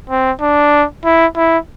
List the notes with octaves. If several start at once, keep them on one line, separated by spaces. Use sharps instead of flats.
C4
D4
E4
E4